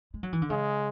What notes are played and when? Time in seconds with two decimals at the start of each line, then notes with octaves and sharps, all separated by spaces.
0.14 G#3
0.23 F#3
0.33 E3
0.42 D3
0.50 C#3 G#3